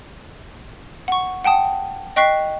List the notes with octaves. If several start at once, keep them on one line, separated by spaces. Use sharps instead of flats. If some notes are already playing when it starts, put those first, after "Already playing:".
F#5 C#6
F#5 G5 A5 D#6
D#5 G5 C#6 F#6 B6 C7